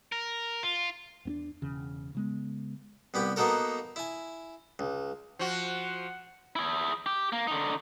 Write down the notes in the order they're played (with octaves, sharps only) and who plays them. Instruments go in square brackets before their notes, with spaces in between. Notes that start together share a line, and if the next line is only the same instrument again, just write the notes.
[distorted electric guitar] A#4
F4
[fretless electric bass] E2 B3 D4
E1 E2 C#3
C#3 G#3 B3
[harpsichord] C2 B3 G4 B5
A#3 B3 D#4 F#4 A4 A#4
E4 G#5
C#2
[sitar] F3 F#4 [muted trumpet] F#5
[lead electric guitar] E4 G#4
G4
A#3
D3 D#4